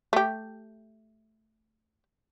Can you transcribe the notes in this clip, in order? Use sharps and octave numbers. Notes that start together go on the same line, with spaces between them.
A3 G4